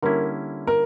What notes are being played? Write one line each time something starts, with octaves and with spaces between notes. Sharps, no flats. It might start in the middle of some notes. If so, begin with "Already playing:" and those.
D3 G3 A#3 C#4 E4 A#4
A#4